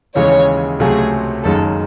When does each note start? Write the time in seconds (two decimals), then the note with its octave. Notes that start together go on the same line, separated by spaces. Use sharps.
0.15 D#2 C#3 E3 G#3 C#5
0.80 C#2 C3 F#3 A3 G#4
1.44 F#1 F#2 D#3 G#3 A4